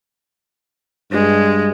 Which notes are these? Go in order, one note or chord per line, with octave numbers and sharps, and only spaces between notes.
G2 G#3